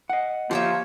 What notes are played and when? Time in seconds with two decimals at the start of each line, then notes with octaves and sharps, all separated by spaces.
0.10 D#5 F#5
0.51 F3 A#3 G4 C#5 E5